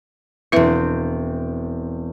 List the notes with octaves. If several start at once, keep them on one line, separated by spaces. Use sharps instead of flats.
E1 C4 E4 B4 E5